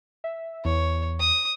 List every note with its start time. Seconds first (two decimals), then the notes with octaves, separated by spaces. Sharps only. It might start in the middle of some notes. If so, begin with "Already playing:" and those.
0.24 E5
0.65 E2 C#5
1.19 D#6